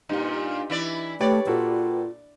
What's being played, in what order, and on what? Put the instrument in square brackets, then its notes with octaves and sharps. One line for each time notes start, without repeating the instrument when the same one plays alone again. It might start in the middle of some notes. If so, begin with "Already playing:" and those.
[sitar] G2 A#2 [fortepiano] D#4 G4
[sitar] E3 E4 D5
[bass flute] A3 [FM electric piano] G4 B4 [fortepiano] C#5 [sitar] D5
[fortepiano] A#2 F#4 A4 [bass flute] F4